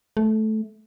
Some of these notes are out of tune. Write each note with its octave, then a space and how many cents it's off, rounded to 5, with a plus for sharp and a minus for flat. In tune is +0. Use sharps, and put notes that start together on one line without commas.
A3 -15